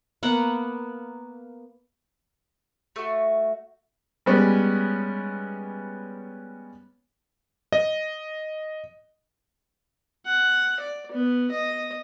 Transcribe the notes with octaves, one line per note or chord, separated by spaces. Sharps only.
A#3 B3 F#5
A3 F#4
G3 G#3 B3 C#4
D#5
F#5
D5
B3
D#5